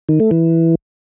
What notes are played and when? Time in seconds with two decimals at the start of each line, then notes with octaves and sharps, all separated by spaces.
0.09 D#3
0.20 A3
0.31 E3